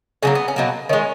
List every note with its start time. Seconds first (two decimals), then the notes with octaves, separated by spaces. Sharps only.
0.23 C#3 F#3 A#3 C#4
0.35 B3
0.48 C#4
0.56 B2 F#3 A#3
0.89 D#3 G#3 C#4